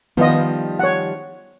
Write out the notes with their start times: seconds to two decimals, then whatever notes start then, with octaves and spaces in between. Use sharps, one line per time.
0.17 D#3 F3 G3 B3 F4 D#5
0.79 C#5 F#5